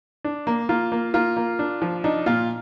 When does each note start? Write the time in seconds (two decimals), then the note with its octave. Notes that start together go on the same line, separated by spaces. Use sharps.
0.24 D4
0.47 A#3
0.69 A#3 F4
0.92 A#3
1.14 A#3 F4
1.37 A#3
1.59 D4
1.82 F3
2.04 D4 D#4
2.26 A#2 F4